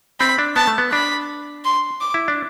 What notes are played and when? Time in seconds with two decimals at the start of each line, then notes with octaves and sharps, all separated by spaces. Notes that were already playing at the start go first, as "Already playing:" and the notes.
0.20 C4 B5
0.39 D4
0.56 B3 A5
0.67 A3
0.78 B3
0.92 D4 B5
1.64 C6
2.01 D6
2.14 E4
2.28 D4